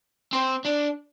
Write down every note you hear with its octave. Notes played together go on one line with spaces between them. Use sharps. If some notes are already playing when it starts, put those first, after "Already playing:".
C4
D4